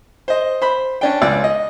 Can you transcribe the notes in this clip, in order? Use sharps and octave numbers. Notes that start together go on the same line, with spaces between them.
C5 D#5
C5 B5
C#4 D4 G5
C#2 D5
D#5